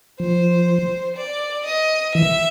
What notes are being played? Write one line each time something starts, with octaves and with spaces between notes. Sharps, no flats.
F3 C5
D5
D#5
E3 E5